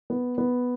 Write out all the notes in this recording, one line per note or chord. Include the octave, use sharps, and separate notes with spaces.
B3
B3